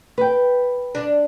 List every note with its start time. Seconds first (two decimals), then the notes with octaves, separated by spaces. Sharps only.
0.18 B4 G5
0.95 D4